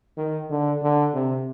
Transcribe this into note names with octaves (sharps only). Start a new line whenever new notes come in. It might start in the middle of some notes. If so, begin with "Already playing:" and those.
D#3
D3
D3
C3